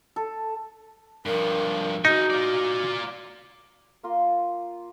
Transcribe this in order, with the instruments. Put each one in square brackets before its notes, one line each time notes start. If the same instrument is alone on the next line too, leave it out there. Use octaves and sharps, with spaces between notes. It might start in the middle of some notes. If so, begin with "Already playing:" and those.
[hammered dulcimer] A4
[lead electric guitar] G2 F3 [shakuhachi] A#4
[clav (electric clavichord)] D#4 [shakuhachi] F#4 [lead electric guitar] G#4 A#4
[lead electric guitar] F4 D5
[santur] A#3 F4 A#4 C6